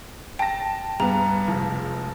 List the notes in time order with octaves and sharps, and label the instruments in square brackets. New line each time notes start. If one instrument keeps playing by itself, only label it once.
[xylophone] G5 [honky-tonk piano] A5 A#6
[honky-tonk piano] G2 B3 [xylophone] A#5
[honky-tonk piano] F1 C#2 F3